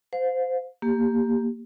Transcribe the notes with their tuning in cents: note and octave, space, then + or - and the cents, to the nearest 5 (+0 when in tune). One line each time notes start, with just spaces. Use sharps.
C5 -20 F5 +35
A#3 +0 G4 +10